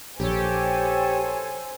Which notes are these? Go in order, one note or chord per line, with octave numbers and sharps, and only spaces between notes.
A#1 G4 A4 C5 C#5 G#5